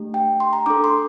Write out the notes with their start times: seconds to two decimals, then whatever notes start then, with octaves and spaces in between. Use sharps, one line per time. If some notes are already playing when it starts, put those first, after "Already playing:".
Already playing: A3 D4 G4
0.14 G5
0.40 C6
0.53 A#5
0.66 D4 A4 D6
0.84 C6